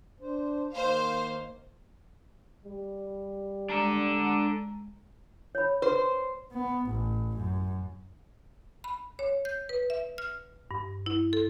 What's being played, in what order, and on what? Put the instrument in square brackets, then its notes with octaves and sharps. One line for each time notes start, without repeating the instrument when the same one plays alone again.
[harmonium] D4 C5
[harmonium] D#3 A#3 [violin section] C5 F5
[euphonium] G3
[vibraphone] G#3 A#5 [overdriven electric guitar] D4 A4
[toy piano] C#5 B5
[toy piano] B4 [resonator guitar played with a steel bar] C5
[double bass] B3
A1
F#2
[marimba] B5
C#5
G6
B4
E5
F6
G2
E4
A4